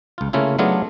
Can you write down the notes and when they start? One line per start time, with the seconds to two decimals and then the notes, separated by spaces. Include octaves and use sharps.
0.18 C#2 F4
0.33 C#3 A3 A#3 C#4 E4 F4
0.59 F#3 A3 B3 D4 F4 G#4